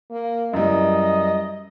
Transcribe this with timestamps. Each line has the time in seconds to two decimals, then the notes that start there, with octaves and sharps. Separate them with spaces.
0.11 A#3
0.54 F#2 E3 G3 D#5